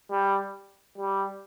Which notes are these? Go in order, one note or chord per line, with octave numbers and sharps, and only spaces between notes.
G3
G3